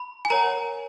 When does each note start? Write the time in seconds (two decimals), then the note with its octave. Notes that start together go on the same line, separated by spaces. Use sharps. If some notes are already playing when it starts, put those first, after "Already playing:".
Already playing: B5
0.25 G#5
0.30 A#4 C#5 F#5 A#5